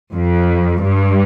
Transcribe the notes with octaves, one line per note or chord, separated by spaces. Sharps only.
F2
G2